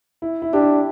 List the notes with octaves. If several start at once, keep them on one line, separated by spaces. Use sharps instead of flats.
E4
E4
D4 G4